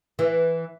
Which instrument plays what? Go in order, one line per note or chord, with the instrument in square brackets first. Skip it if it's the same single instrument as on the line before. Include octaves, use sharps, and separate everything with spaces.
[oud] E3